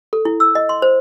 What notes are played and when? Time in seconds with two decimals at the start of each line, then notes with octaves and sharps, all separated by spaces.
0.13 A4
0.25 E4
0.40 E6
0.55 D#5
0.69 C6
0.82 C5